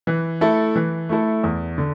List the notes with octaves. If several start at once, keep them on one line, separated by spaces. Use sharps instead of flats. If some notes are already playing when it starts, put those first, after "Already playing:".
E3
A3 E4 A4
E3
A3 E4 A4
E2
D3